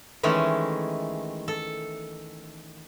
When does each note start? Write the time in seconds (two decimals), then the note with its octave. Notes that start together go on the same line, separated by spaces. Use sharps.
0.23 D#3 E3 G#3 A3 C#4
1.48 A4